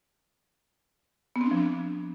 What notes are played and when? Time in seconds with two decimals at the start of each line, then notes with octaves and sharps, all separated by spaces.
1.36 B3
1.41 C4
1.46 D4
1.51 F3
1.57 D4